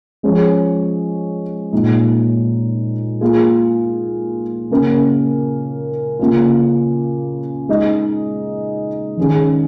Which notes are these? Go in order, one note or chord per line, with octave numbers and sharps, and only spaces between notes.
F3 G#3 C#4 G#4 C#5
A#2 G#3 D#4
A#3 F4 G#4
C#3 A#3 C#4 A#4
C#3 A#3 C#4 F4
G#3 D#4 G#4 D#5
D#3 C#4 G#4